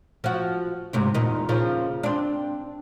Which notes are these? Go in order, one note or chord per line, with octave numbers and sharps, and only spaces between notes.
F3 F#4
D2 G#2 C3
E2 A#2 D#4
A#2 C#3 F3
C4 D4